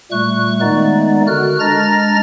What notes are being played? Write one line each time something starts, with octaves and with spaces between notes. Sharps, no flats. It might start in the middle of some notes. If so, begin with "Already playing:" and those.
A#2 G3 A3 C#6 F#6
D#3 G#3 A3 B3 D#4 D5
D3 F#4 A#4 F6 F#6
G#3 D4 A#5 F6 A6 A#6